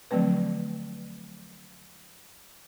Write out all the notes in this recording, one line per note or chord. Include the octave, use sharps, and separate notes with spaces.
D3 F3 F#3 A3 C4 B4